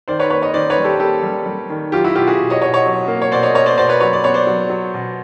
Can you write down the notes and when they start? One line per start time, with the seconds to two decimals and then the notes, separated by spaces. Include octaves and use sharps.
0.08 D#3 C5 D5
0.19 B4 C#5
0.30 A#3 B4 C#5
0.42 C#5 D#5
0.54 D#3 C5 D5
0.70 B4 C#5
0.78 G3
0.84 G4 A4
1.00 A#3 G4 A4
1.23 G3
1.46 G3
1.70 D#3
1.92 F#3 F4 G4
2.04 E4 F#4
2.15 B2 F4 G4
2.27 F#4 G#4
2.39 B2
2.50 C#5 D#5
2.62 B2 C#5 D#5
2.74 C#5 D#5
2.86 F#3
3.08 A#3
3.22 C#5
3.32 B2 C5 D5
3.42 C#5 D#5
3.54 A#3 C#5 D#5
3.66 C5 D5
3.77 B2 C5 D5
3.89 B4 C#5
4.00 F#3 B4 C#5
4.13 D5
4.24 B3 C#5
4.34 C5 D5
4.47 F#3
4.70 F#3
4.94 B2